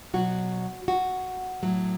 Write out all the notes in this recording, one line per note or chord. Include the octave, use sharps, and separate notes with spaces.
B2 F#3 F#4
F#4
A2 F#3